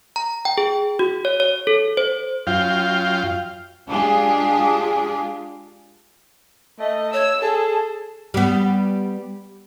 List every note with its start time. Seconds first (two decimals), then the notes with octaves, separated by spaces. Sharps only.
0.16 A#5
0.45 G5
0.58 G#4
0.99 F#4
1.25 C#5
1.40 C#5
1.67 A4
1.97 C5
2.47 F#2 F4 F5 G5
3.89 G#3 D4 F4 G4 G#4
6.79 A3 D#5
7.13 C#5 E6
7.42 G#4 A4 A5
8.34 G3 B3